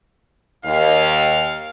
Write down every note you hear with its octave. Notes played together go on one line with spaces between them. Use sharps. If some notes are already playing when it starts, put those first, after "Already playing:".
D#2 F5